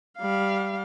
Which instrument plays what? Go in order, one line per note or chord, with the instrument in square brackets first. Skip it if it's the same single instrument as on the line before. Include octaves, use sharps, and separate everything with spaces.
[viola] G3 F5